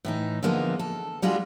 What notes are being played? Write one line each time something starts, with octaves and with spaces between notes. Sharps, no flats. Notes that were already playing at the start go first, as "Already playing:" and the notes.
A2 E3 D#4
D3 F3 G#3 A#3 B3
A4
G3 G#3 D4 F4 F#4 G#4